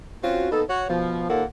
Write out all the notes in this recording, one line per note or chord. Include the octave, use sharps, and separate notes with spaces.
C4 C#4 F4 F#4
A#3 B3 D#4 A4
F#4 C#5
B2 F3
D#2 A#2 A#3 A4 F#5